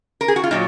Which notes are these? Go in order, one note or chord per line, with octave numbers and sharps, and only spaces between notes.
A#4
G#4
F#4
F4
A#2 F#3 D#4